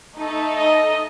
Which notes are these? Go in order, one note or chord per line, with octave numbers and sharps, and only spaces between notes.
A3 D#4 A4
D#5